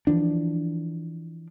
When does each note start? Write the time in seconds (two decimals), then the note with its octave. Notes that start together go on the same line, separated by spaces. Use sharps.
0.07 E3 F3 D4